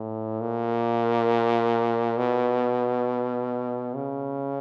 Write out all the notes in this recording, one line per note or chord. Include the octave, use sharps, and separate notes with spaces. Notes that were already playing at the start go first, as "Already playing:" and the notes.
Already playing: A2
A#2
B2
C#3